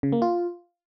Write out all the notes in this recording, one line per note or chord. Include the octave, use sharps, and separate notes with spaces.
C#3
A#3
F4